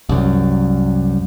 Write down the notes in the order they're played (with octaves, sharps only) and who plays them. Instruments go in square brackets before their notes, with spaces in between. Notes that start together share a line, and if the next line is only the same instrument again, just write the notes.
[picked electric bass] C2 F#2